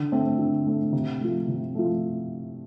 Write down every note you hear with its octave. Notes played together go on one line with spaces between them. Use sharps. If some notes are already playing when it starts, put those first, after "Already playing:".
Already playing: D3
A3 C4
D3
A3 C4
C3
F3 A3
C3
F3 A3